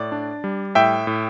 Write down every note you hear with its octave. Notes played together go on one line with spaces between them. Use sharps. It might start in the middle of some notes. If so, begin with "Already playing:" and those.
Already playing: A2 D5
D4
G3
A2 E5 G5
A2